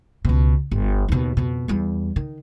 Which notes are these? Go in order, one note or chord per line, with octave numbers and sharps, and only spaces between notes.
C#2 B2
G1
D#2 B2
F2 B2
E2 G3
D#3